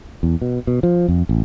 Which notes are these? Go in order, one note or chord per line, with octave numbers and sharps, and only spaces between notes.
E2
B2
B2
F3
F2
A1